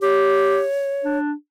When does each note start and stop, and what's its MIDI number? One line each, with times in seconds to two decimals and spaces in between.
0.02 0.63 67
0.02 1.18 73
1.04 1.33 62